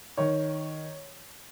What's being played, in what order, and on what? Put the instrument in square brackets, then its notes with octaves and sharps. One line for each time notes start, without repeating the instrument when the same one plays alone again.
[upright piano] D#3 C#5